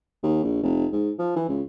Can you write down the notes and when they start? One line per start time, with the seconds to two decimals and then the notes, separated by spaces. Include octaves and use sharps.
0.23 D#2
0.43 A#1
0.63 F1
0.93 G#2
1.19 F3
1.36 E3
1.49 C#2